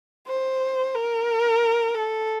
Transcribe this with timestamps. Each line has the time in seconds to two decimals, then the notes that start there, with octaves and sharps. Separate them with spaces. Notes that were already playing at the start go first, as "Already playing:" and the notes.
0.27 C5
0.94 A#4
1.95 A4